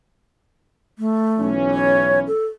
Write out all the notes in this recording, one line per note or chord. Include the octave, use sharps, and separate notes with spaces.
A3
B1 E3 C#4
C#5
A4